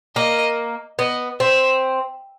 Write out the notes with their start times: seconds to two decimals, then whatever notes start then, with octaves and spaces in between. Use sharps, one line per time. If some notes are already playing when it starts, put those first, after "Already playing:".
0.16 A#3 D#5
0.99 B3 D#5
1.40 C4 E5